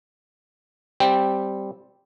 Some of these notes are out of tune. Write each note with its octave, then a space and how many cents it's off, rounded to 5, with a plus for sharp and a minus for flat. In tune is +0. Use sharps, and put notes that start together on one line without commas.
G3 +0 C4 +0 G5 +0